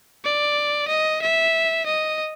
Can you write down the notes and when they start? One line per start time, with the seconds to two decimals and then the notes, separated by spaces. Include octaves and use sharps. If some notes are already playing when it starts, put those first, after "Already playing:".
0.24 D5
0.88 D#5
1.22 E5
1.86 D#5